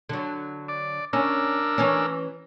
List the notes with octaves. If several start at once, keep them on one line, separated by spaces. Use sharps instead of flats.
D3 F#3
D5
C#4 D4 A#4 E6
E3 C#4